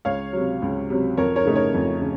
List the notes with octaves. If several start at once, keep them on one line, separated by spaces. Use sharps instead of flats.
C#2 C#5 F5
C3 F#3
C#2
C3 F#3
F2 A#4 C#5
A#4 C#5
C#3 A3 D#4
A#4 C#5
F2
C#3